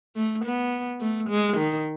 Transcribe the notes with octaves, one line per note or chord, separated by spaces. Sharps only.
A3
B3
A3
G#3
D#3